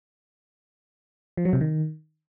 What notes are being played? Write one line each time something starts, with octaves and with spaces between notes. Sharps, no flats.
F3
F#3
C3
D#3